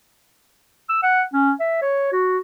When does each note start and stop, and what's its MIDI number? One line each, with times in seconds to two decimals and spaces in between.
0.89 0.99 88
1.03 1.23 78
1.33 1.51 61
1.60 1.81 76
1.82 2.09 73
2.12 2.38 66